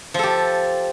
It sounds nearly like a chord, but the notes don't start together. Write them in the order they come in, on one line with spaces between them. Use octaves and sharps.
F3 A4 G4